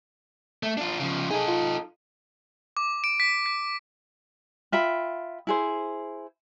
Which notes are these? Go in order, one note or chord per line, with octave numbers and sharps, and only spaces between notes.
A3
D4 F4
C#3 F3
D#4 G#4 A4 G#5
F4
D6
D7
B6
B6
F4 E5 G5 B5
E4 G#4 C5